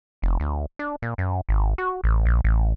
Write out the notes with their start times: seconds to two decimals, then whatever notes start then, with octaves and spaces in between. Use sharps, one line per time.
0.22 F1
0.40 D2
0.79 D4
1.02 A#2
1.18 F#2
1.49 G#1
1.78 F#4
2.04 A1
2.26 A#1
2.44 A1